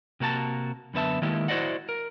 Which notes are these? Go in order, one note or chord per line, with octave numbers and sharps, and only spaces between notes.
C3 A#3 F#4 A5 A#5
F#2 D3 B3 E5 A5
D#3 G#3 A#3 E4 G4
E4 F#4 C5 D5 D#5 F#5
A#4